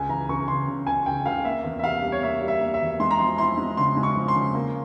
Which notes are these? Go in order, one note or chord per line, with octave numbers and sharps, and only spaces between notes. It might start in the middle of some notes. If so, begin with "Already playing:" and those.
Already playing: C#2 G#5
E3 A#5
C#2 C#6
C#3 C6
C#3
C#2 G#5
C#2 G5
C#2 F5
A#3 E5
E2
E5
C3 F5
G3
C#5
A#3 E5
G3
E5
A#3
E5
E2
G#3 C6
A#5
F3 C6
E4 C6
G#3
C#3 C6
G#3
C#6
F3
C6
C#3
A#3